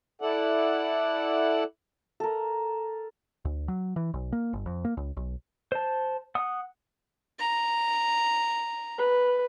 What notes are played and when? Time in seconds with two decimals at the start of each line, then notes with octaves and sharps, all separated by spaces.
0.21 E4 A4 D5 F#5
2.20 A4 A#4
3.45 D2
3.68 F#3
3.96 E3
4.14 B1
4.32 A#3
4.53 G1
4.66 F2
4.85 A#3
4.97 C#2
5.17 B1
5.72 C5 A5
6.35 F#5 D#6
7.39 A#5
8.99 B4